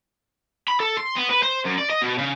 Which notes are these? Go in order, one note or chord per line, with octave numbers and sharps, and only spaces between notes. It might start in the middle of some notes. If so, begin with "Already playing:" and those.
B5
A4
C6
B3
B4
C5
F#2
D5
D#5
B2
C#3